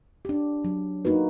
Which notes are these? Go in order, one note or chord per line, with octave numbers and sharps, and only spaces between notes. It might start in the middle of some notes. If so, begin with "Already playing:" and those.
D4 G4
F#3
A#3 D#4 F#4 B4